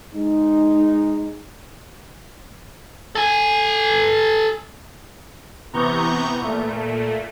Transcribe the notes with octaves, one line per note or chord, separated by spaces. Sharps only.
G#3 D#4
A4 G#5
C3 E3 B3 A#5 C#6 G6
A#2 A3